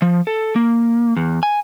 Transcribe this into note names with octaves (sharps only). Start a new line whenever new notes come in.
F3
A4
A#3
E2
G#5